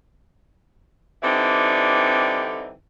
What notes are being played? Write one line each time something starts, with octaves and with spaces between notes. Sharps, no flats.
D3 E3 G3 C4 D#4